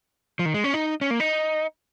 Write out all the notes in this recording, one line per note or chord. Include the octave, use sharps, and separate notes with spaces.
F3
D#3
G#3
C#4
D#4
C#4
A#3
D#4